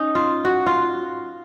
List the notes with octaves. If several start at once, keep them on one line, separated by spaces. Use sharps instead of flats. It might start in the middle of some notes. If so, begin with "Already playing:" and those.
Already playing: C#4 D#4
F4
F#4
F4